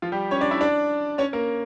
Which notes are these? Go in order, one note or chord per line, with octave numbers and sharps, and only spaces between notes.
F3 F4
G3 G4
C#4 C#5
D4 D5
E4 E5
D4 D5
C#4 C#5
A#3 A#4